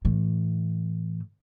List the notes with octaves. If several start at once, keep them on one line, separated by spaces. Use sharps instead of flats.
A2 E3